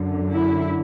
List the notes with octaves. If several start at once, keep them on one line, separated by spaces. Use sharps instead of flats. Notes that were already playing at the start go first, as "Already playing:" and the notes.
Already playing: F#2 D3
E4